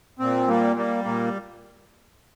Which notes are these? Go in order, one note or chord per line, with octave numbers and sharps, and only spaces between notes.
A#2 C4
G3 A#3
G3 A#3
A#2 A#3